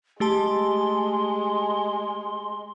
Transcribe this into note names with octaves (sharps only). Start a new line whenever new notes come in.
G#3 A3 G4 A5 C6